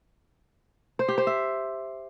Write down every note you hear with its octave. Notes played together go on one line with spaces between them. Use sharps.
C5
G4
C5
E5